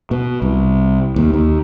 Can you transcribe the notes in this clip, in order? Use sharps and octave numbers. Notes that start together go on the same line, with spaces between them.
B2
C2
D#2
D#2